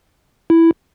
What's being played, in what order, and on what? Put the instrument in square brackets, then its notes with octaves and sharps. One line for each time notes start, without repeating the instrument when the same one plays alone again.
[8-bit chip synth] E4